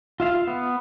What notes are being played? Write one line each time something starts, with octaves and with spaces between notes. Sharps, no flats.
F4 E5 F5
B3